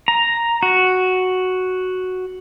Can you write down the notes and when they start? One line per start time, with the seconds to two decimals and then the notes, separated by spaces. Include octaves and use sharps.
0.08 A#5
0.63 F#4